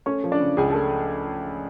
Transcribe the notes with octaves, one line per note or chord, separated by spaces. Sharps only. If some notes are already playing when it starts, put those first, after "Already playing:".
A3 C#4 C#5
F3
D4 D5
C#3
C#2 G#4 G#5
A3 A4 A5